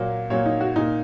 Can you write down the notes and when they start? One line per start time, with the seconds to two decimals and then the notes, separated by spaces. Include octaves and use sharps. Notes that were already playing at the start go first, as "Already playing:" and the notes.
Already playing: A#2 F#3 A#3
0.30 A#2 F#3 A#3 C#5
0.46 D#4
0.61 F#4
0.76 A#2 A#3 D#4